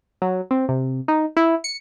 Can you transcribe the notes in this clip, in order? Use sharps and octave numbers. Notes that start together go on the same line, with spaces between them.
F#3
C4
C3
D#4
E4
C#7